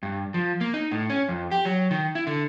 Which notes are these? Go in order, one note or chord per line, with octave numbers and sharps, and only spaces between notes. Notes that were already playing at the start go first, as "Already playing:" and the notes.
G2
F3
A#3
D#4
A2
C#4
F2
G4
F#3
D#3
E4
D3